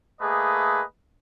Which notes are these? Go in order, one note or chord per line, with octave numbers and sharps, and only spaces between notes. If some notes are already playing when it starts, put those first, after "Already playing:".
A3 A#3 G#4 B4 D#5